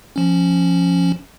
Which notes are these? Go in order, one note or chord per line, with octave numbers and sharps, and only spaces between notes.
F3 C#4